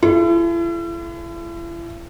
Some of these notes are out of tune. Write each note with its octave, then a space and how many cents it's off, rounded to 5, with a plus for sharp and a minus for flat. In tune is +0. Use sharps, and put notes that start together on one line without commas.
E4 +40 A4 -45